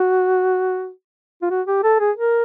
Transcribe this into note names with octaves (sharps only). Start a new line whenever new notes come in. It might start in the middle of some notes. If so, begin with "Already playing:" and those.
Already playing: F#4
F4
F#4
G4
A4
G#4
A#4